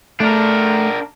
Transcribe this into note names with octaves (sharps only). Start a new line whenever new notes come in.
A3 D4 A#4